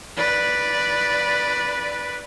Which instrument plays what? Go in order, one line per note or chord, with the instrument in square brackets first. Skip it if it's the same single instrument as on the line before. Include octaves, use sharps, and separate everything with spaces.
[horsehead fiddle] B4 D5